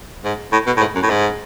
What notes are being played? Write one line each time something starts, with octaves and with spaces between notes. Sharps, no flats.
G#2
A2
B2
A2
G#2
F#2
A2
G#2